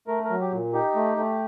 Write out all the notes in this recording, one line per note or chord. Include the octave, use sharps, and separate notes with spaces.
A3 A#4
A#4
F#3
G4
A#2
D#4 G4
A3
A3